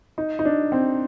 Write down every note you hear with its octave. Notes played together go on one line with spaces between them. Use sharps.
D#4
D#4
D4
C4